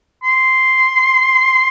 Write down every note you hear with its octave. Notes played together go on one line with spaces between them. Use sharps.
C6